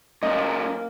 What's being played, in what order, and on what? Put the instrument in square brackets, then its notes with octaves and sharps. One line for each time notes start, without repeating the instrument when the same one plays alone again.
[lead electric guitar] F#2 A#2 [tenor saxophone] A#3 [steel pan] D#5